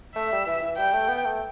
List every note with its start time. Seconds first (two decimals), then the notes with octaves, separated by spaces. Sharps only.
0.16 A3 E5
0.32 G3
0.47 E3
0.62 E3
0.78 G3 G5
0.94 A3
1.09 B3
1.25 A3